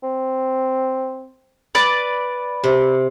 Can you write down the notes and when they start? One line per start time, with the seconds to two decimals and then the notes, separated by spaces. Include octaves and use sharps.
0.03 C4
1.75 B4 D5
2.64 C3